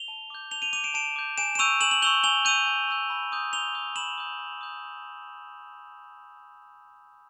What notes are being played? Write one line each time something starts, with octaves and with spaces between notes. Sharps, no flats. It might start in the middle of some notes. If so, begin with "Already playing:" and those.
Already playing: F7 G7
A5
D6 G6
A5 F7 G7
D#7 F7
D6 G6 D#7 F7
D7 E7
A5 D7 E7
D6 G6
G#5 D7 E7
E7
C#6 E6 G6 D#7 F7
G#5 E7 F#7
F#7
C#6 E6 G6 F7 G7
G#5 F7 G7
C#6 E6 G6 D#7 F7
G#5
C#6 E6 G6
B5
D#6 G6
B5 F7 G7
D#6 G6
B5 E7 F#7
D#6 G6
B5
D#6 G6